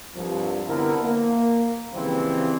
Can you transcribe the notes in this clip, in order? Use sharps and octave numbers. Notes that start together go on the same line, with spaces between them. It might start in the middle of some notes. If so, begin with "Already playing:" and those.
C2 G2 F3
C2 D3 B3 C4 E4 A#4
A#3
C#3 E3 F3 G3 C4